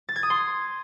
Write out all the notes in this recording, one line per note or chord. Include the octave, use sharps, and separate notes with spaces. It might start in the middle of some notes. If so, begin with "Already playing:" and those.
A6
G#6
D#6
C6